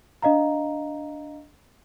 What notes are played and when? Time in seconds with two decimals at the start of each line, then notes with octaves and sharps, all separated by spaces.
0.22 D4 D#5 F5 A#5